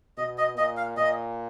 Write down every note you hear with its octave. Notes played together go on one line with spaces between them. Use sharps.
B2 D#5
D#5
A#2 D#5
F5
A#2 D#5